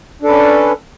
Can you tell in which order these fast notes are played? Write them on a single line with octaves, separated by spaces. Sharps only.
D4 A4 B4 C#4